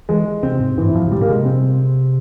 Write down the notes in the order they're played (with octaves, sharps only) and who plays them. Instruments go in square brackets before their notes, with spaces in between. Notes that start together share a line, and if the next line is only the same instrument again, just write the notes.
[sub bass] E3 [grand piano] G#3
[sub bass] C3 [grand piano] C4
[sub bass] G#2
[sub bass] G2 [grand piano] E3
[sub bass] G#2 [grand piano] F3
[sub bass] C3
[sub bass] A#2 [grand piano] G3
[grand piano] A#3
[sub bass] C3 [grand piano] G#3
[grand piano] C4